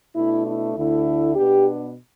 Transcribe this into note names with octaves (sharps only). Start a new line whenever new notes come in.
B2 A3 D4 E4
E4
D2 D3 A3 E4
B2 B3 D4 G4